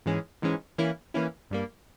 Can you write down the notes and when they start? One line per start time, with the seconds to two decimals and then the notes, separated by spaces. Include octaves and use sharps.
0.06 G#2 E3 G#3 C#4
0.42 G#2 E3 G#3 C#4
0.78 E3 A#3 C#4 E4
1.14 E3 A#3 C#4 E4
1.51 G2 G3 A#3